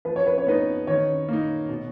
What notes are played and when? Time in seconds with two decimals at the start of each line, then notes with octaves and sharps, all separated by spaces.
0.05 F3 B4
0.16 C#5
0.27 B4
0.38 C#5
0.46 B3 D#4 B4
0.87 D#3 C#5
1.29 A#3 D#4
1.69 B2